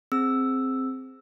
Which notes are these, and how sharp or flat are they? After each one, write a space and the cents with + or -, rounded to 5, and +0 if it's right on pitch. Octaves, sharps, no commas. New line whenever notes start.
C4 +0 G#4 +0 E6 +0